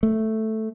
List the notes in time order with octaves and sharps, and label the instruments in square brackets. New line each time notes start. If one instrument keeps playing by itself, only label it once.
[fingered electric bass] A3